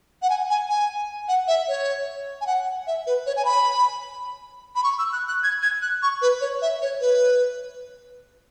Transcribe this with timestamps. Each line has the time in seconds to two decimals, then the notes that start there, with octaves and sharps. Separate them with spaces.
0.22 F#5
0.30 G#5
0.50 G#5
0.70 G#5
1.28 F#5
1.48 E5
1.68 C#5
2.41 G#5
2.47 F#5
2.87 E5
3.07 B4
3.26 C#5
3.37 G#5
3.45 B5
4.76 B5
4.84 C#6
4.99 E6
5.13 F#6
5.28 F#6
5.43 G#6
5.62 G#6
5.82 F#6
6.02 C#6
6.22 B4
6.41 C#5
6.62 E5
6.82 C#5
7.01 B4